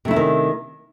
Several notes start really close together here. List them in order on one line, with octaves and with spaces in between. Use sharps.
C3 A3 E4 C#4 D#3